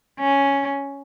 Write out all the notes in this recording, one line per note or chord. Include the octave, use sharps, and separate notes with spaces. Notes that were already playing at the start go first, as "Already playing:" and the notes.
C#4